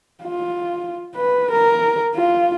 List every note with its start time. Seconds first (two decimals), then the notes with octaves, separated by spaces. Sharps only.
0.24 F4
1.16 B4
1.52 A#4
2.15 F4